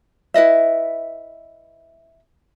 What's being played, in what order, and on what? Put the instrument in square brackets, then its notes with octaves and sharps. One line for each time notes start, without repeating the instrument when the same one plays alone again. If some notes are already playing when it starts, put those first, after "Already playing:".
[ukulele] E4 B4 D#5 E5